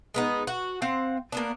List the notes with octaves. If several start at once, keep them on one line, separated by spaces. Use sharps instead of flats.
G#3 B3 D#4
F#4
C4 F5 F#5
A#3 B3 D4